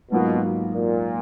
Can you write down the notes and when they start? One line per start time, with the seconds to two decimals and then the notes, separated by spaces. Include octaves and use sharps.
0.12 G#2 B2 F#3 A#3 F4
0.74 A#2